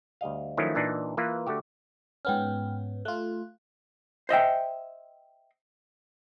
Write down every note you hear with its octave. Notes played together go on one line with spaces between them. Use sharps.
D2 G3 D#5 F5
D#3 F3 F#3 A3 C#4 E4
A#2 E3 D4 D#4
E3 A#3 F4 B4
D3 A3 F#4 G4
G#2 B3 C#4 G5 F6
A3 F4 F#6
C5 D#5 E5 G5